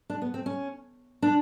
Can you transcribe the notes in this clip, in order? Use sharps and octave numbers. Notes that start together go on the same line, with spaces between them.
D4
B3
C4
C#4
D4